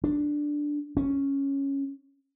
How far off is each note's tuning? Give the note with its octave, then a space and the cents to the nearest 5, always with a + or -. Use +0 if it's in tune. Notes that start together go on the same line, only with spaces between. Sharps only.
D4 +0
C#4 -5